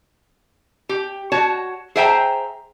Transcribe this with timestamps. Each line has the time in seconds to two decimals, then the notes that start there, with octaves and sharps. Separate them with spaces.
0.89 G4
1.32 F#4 C#5 A5
1.96 G#4 C5 E5 G5 G#5 A#5